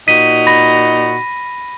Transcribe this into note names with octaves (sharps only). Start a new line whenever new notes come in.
A#2 D#4 F#4 B6 D#7
B5 A#6